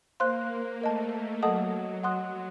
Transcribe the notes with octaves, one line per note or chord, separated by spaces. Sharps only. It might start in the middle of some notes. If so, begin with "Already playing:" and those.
A#3 C5 F5 C6 F#6
A#3
A3 A#4 D#5 A5
F#3 A4 D#5 F#5 A5 D#6
F#5 C6 D#6 F#6